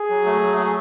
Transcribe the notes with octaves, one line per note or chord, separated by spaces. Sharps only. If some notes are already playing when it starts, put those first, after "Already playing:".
Already playing: G#4
F#3
A3
F#3
A3